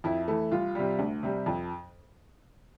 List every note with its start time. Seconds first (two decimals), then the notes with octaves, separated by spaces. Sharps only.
0.04 F2 E4
0.28 E3 A3
0.51 C2 F4
0.75 C3 G3
0.99 D2
1.23 C3 G3
1.46 F2